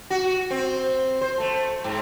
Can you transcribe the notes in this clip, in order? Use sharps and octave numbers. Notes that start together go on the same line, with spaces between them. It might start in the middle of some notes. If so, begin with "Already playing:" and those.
F#4
C4
C5
A3
G#2